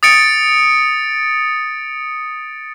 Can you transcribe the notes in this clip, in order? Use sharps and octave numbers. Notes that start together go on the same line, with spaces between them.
D#6 A6 C#7 D7